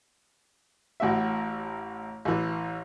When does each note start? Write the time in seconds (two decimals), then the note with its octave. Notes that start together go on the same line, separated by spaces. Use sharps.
1.00 A1 A2 F#4 E5
2.25 A1 E3